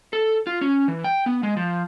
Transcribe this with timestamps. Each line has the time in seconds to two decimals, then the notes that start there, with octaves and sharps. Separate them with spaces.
0.13 A4
0.47 F4
0.61 C#4
0.88 E3
1.04 G5
1.26 B3
1.43 G#3
1.57 F3